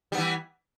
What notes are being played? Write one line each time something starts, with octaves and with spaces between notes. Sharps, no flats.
E3 G3 B3